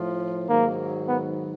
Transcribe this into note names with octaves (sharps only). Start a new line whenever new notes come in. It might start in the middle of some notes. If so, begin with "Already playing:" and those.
Already playing: A2 F3
G#2 D#3 F#3 A#3
B3